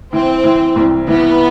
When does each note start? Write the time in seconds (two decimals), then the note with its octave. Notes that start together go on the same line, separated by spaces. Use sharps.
0.13 E3 C4
0.44 E3
0.76 C2
1.08 E3 B3